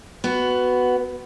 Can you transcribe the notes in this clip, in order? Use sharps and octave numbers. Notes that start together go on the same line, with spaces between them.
B3 F#4